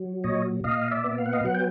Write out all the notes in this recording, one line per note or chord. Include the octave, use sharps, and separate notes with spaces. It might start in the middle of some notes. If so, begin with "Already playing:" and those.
Already playing: F#3
A#2 C#5 D#5
A#2 D#5 F5
D5 E5
B3
F5
F#5
D#5 F5
F#3 F#5
G5